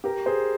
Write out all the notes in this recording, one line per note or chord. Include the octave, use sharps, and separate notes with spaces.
G4 A#4
G#4 C5